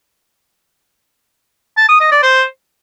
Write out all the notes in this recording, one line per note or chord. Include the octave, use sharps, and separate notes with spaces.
A5
D#6
D#5
D5
C5